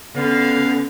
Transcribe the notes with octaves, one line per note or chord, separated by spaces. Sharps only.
D3 B3 C#4 F5